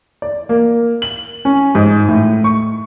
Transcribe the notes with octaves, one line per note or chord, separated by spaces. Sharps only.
D5
A#3
F#7
C#4
G#2
A2
C#6